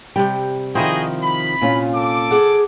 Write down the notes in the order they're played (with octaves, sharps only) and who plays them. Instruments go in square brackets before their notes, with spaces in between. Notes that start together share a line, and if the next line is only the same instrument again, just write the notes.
[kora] C3 G3 [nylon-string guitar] G5
[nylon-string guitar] D#3 F3 [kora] C4 D#4 E4 [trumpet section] F#4 G#4 D#5
[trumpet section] B5
[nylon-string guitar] A#2 C#4 F4
[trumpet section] A4 D6
[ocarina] G#4 [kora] F#5